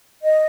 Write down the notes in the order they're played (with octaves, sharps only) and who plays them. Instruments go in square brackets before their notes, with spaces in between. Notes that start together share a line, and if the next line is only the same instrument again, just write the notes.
[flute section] D#5